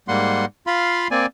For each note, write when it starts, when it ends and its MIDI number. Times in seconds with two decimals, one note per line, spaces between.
0.08 0.45 44
0.08 0.45 55
0.08 0.45 58
0.08 0.45 78
0.08 0.45 84
0.67 1.08 65
0.67 1.08 77
0.67 1.08 83
0.67 1.08 84
1.11 1.26 58
1.11 1.26 60
1.11 1.26 74
1.11 1.26 80